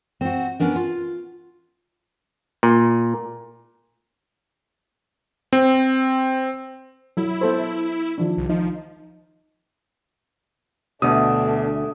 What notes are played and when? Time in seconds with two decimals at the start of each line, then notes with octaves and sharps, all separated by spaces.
0.21 C4 F#4
0.60 B3 C#4 D4 A#4
0.75 F4
2.63 A#2
5.53 C4
7.17 F#3 E4
7.41 B3 A4 C5
8.18 D#3 F3 D4
8.37 C2
8.49 F3 D#4
11.02 D2 B2 A3 D4 D#6